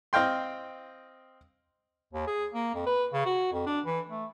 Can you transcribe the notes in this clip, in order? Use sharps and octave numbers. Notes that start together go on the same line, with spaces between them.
C4 D#5 F5 G5 C6
D#2
G#4
A#3
F2
B4
C#3
F#4
F2
D4
E3
A3